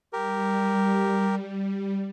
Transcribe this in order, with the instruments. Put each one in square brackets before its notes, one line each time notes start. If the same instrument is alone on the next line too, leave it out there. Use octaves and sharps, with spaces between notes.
[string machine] G3 [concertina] G4 A#4